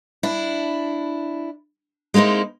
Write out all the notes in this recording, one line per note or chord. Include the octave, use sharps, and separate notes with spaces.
D4 E4
G#3 A#3 C4 D#4 E4